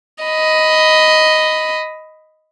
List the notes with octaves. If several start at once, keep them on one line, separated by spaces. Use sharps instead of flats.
D#5 B5